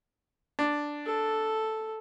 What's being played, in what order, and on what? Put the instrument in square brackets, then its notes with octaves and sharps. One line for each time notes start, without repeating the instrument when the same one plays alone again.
[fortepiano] D4
[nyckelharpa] A4